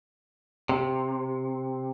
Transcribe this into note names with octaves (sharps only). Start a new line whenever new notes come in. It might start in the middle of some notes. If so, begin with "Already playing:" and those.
C3